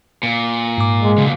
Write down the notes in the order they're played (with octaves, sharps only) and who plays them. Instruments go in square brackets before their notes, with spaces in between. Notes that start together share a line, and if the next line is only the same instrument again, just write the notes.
[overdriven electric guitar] A#2
[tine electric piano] G#2 D6
[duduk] G#3
[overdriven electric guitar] B1 A#2 [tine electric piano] C#3